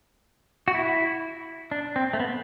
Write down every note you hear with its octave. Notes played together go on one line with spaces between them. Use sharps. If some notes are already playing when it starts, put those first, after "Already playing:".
F#4
E4
D4
C4
A3
B3